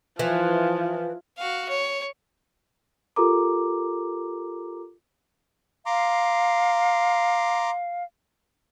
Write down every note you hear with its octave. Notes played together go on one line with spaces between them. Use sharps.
E3 F3
F#4 F5
C#5
F4 G4 A4 A#4 A#5 D6
F5 A#5 C6 D6